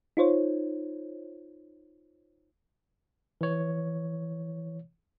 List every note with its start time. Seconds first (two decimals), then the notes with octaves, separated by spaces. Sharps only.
0.17 D#4 F4 C5 C#5
3.41 E3 C#5